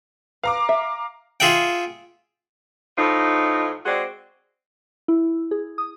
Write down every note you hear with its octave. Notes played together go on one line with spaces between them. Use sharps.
B4 F5 A#5 D6
E5
F4 G#4 E5 F#5 G5
A2 F3 D#4
G#3 C4 F#4 D5
E4
G#4
D#6